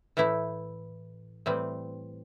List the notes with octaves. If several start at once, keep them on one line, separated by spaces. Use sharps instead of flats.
A2 E3 A3 E4
A2 E3 G3 C4